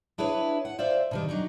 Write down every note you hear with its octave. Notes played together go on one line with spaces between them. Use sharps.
D4 E4 G#4 B4 C#5
F#5
F4 C5 D5 E5
B2 D#3 G3
F#3 D4 D#4